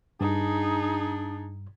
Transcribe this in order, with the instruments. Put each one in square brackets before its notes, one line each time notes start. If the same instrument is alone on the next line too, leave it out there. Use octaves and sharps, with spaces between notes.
[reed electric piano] G2 [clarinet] D4 [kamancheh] D#4 G#4